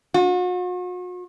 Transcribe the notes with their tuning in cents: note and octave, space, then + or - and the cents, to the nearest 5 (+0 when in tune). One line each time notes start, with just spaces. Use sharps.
F#4 -45